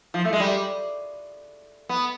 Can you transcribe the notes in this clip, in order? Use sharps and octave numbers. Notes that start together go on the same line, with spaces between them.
F3
A3
G#3
G3
B3